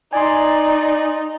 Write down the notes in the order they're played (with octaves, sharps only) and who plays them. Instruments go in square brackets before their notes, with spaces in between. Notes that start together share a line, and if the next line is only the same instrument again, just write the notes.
[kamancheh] D#4 [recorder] D5 [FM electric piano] G#5 C6